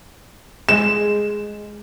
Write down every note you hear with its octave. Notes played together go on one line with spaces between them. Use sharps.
G#3 E7